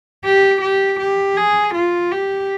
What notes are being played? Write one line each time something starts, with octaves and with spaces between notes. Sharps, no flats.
G4
G4
G4
G#4
F4
G4